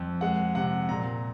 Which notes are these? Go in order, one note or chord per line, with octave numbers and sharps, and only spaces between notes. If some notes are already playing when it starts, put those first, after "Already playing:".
Already playing: F2
G#3 F#5
C3 F#5
A#2 A#5